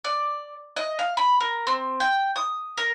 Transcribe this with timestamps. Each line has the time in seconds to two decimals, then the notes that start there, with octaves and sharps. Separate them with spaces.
0.04 D5
0.76 D#5
0.99 F5
1.17 B5
1.40 A#4
1.67 C4
2.00 G5
2.36 D#6
2.77 A#4